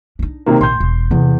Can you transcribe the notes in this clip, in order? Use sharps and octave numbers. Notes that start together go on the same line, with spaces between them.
D4 D#4
C3 D#3 A#3
A#1 C6 G6
E1
E2 C3